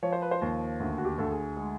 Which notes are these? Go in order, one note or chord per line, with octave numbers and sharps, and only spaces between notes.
F3 C#5
C5
B4
C5
D#2
D2
F#4
G4
D2 A4
G#4
G#3